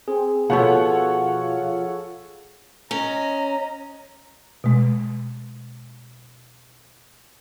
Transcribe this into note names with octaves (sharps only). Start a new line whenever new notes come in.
C4 G#4
B2 F3 B3 F4 A4 C#5 F#5
C#4 D#5 A#5
B2 G#3